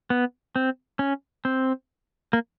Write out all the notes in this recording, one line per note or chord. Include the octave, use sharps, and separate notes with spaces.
B3
C4
C#4
C4
A#3